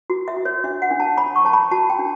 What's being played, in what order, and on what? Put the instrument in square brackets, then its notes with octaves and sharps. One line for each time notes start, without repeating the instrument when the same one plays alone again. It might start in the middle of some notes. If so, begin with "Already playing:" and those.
[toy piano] F#4
E5
F#4
C#5
D4 E5
F#5
D4
A5
C#5 B5
C#6
C#5 A5
B5
F#4 A5
G5
D4